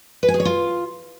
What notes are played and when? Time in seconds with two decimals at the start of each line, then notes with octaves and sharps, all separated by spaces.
0.23 B4
0.28 G#5
0.34 G#4
0.40 C#5
0.45 F4